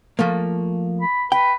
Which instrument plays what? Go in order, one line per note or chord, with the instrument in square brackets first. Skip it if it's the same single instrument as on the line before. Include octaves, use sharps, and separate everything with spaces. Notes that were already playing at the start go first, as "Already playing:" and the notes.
[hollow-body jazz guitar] F3 A3 A#3
[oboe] B5
[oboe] B4 [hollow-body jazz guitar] G5